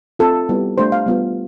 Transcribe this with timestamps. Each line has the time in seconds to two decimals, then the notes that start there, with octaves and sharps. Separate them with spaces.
0.19 C4 F4 A4
0.49 G3 B3 E4 G4
0.77 A3 D4 G4 C5
0.92 F5
1.06 G3 B3 F4